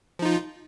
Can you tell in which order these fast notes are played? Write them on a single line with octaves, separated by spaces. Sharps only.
F3 D#4 F4